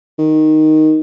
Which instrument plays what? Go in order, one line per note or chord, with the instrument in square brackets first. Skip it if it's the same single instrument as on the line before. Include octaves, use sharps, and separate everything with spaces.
[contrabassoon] D#3